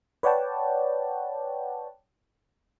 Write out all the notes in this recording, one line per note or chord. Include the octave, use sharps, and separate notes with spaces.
B4 C#5 D5 F#5 G5 A5